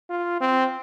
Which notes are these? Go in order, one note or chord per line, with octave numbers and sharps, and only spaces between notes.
F4
C4